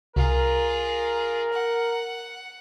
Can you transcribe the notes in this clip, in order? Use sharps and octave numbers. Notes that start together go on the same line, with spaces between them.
C2 F4 G#4 A#4
F#5